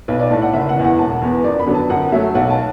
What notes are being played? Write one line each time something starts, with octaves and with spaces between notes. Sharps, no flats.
B1 B4
D5
A2 A3 A5
F#5
F#1 E5
F#5
E2 E3
F#5
E1 A5
E2 E3 B3
F#2 D5
B5
D3 F#3 B3
A5
F#2 F#5
F#3 A3 E5
B1 F#5
A5